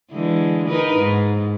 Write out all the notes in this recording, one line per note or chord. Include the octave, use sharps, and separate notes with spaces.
D3 E3 G#3
D#4 A#4 B4
G#2